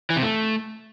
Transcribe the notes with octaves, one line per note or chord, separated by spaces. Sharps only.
E3
C3
A3